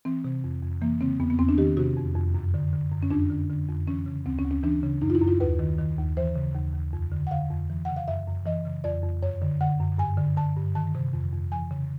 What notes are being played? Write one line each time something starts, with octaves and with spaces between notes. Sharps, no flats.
E3 C4
C3
F2
F2
E3 A#3
C#3 C4
E2 B3
B3
E2 C4
D4
D#3 G4
C3 F#4
F2
F2
F#2
D3
D3
F#2
C#4
F2 D4
D3
D3
F2
E3 C#4
C#3
D2 C4
C#4
D2
C#4
E3 D4
C#3
F#2 D#4
F4
E4
F#2
F4
D#2 B4
D#3
D#3
D#2
E3 C5
C#3
D#2
D#2
F2
D3
F#5
D3 F5
F2
E3
C#3 F#5
F5
F#2 E5
F#2
E3 D#5
C#3
F2 D5
F2
F#2 C#5
D3
D3 F#5
F#2
G2 G#5
D3
D3 A5
G2
D#3 A5
C3
F2
F2
E3 G#5
C#3